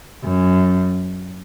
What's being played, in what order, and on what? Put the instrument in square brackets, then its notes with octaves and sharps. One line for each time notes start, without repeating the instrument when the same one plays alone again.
[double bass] F#2